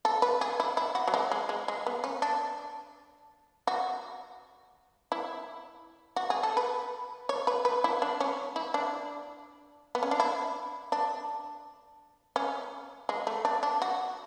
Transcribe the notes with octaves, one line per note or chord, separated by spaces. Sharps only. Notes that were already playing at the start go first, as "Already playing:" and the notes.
A4
B4
G#4
E4
E4
F#4
F#3
G#3
G#3
G#3
G#3
B3
C#4
D4
F#4
E4
F#4
G#4
A4
B4
C#5
B4
B4
E4
D4
C#4
E4
D4
B3
C#4
D4
E4
D4
C#4
G#3
A3
D4
D4
F#4